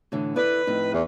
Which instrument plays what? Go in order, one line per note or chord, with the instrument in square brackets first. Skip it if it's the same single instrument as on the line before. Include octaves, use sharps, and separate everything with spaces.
[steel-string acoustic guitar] A2 D3 E3
[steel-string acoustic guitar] E4 A4 D5 [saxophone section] B4
[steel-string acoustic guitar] F2 A2 D#4
[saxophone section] E2